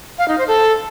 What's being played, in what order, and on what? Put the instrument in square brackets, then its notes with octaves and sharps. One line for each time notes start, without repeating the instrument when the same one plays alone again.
[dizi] F5
D#4
C5
A4